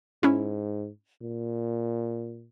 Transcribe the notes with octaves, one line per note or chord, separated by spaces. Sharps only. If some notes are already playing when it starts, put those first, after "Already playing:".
G#2 C#4 E4
A#2